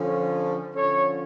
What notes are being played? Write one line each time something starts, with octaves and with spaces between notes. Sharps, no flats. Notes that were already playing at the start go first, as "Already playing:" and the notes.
Already playing: D3 F3 C#4
D3 F3 C#4 A4 C#5